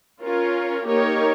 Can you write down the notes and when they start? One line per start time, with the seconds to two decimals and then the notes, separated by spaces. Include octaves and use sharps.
0.23 C#4 F4 A#4 C#5
0.86 A#3 D#4 G4 A#4 C#5